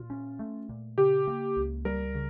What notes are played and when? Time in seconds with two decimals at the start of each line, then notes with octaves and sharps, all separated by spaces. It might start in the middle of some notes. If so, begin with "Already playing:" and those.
Already playing: A#2 F4
0.10 C#4
0.39 A3
0.69 A#2
0.98 C#3 G4
1.27 A#3
1.56 C#2
1.85 G3 A#4
2.14 C#3